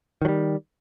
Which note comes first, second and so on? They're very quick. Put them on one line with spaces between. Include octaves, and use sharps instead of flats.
D#3 F#3 G3